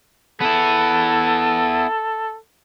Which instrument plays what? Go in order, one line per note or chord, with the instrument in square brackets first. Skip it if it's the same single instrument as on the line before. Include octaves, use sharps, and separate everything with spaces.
[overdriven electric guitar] B3 E4 [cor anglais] A4